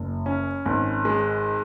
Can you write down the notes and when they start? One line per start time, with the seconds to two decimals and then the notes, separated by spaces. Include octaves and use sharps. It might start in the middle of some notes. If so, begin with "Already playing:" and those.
Already playing: F#1
0.26 C#4
0.65 G#1
1.05 G#3